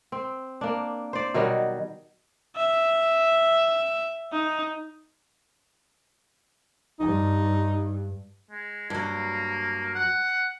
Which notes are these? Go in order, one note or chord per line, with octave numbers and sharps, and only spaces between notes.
C4
A#3 D4
C5 D5
B2 D#3 F#3 G3
E5
D#4
G2 D#4
G#3
G2 F#3 A#3
F#5